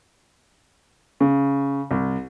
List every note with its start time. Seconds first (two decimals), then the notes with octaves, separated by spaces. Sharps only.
1.20 C#3
1.91 C2